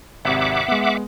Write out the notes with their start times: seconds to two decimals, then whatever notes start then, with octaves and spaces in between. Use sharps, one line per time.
0.25 G#1 C3 E5 F#5 D6
0.68 G#3 B3